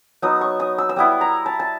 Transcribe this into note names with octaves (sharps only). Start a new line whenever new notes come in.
F#3 B3 D#4 D#6
C#6
D#6
E6
E6
G3 B3 E4 D#6
A#5
A5
A5